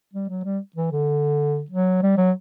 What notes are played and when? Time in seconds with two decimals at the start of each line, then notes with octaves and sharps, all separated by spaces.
0.13 G3
0.29 F#3
0.44 G3
0.76 E3
0.91 D3
1.70 F#3
2.02 G3
2.17 F#3